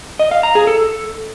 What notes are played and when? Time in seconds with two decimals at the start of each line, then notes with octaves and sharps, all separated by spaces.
0.19 D#5
0.31 F5
0.43 A#5
0.55 G#4
0.67 A4